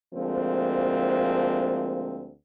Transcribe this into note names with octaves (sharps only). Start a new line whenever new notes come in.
D2 F3 G#3 A#3 C4